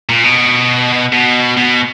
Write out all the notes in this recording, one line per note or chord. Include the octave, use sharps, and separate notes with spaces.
A#2
B2
B2
B2